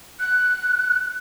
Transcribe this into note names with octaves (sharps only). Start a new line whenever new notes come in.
F#6